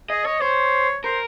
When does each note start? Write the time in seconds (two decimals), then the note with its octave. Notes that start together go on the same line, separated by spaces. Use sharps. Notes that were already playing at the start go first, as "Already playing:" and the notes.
0.10 G#4 D#5
0.25 C#5 D#5
0.41 C5 C#5
1.04 A#4 C5